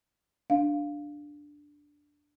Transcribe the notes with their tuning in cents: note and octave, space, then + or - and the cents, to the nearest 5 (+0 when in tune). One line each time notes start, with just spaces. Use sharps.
D4 +0 F5 +0